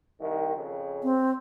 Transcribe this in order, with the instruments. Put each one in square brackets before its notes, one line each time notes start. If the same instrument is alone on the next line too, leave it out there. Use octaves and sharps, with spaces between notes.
[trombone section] C2 D#3
F2 C#3
[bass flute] C4